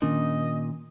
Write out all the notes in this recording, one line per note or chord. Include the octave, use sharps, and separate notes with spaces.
A#2 D#3 C#4 D4 D#5